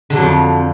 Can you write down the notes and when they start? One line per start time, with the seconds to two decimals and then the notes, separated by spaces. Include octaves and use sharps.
0.10 D3
0.15 F#3
0.21 F2